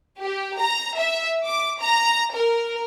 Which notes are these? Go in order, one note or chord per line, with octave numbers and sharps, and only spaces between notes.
G4
A#5
E5
D6
A#5
A#4